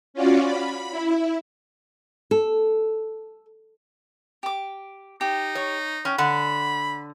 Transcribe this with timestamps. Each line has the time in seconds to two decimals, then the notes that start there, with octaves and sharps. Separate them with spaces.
0.14 C#4 F4 F#4 D5
0.43 B5
0.91 E4
2.31 A4
4.43 G4 D6
5.21 D#4 G4
5.55 C#5
6.05 C#4 G5
6.18 D3 F#5 B5